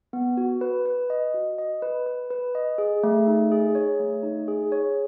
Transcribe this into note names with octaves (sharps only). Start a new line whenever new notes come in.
B3
F#4
B4
B4
D#5
F#4
D#5
B4
B4
B4
D#5
G#4
A3
D#4
G#4
C#5
A3
D#4
G#4
C#5